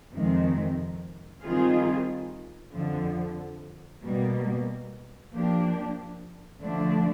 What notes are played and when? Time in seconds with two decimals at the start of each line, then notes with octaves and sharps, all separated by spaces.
0.12 F2 C3 D#3 G#3 C4
1.42 D#3 G3 C4 F4 G#4
2.73 F2 D3 F3
4.02 B2 G3 A#3
5.31 F3 A#3 D4 G4
6.61 D3 F3 A3 D4